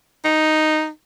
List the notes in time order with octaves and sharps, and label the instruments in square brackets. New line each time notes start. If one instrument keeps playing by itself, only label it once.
[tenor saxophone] D#4